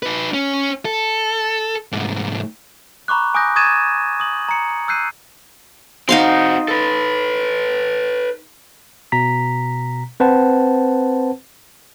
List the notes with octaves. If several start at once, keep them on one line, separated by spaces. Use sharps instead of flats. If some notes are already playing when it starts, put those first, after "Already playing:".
D#4 B4
C#4
A4
C2 G#2
A#5 B5 C#6 D6 F#6
G#5 D6 D#6 F#6 G6 A#6
C#6 D#6 G#6 A6 D#7 E7
D#6 F#7
A#5 C#7
E6 F#6 G6 C7 D#7
C4 D#4 F#4 F5 C6
A4 B4
B2 A#5 B6
C4 B4 C5 F#5 A5